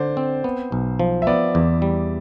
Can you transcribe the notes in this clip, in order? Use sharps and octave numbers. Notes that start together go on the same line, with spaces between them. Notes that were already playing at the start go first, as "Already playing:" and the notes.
Already playing: D3 C5 D5
C4
B3
B1
F3
E5
B3 D5
E2
G3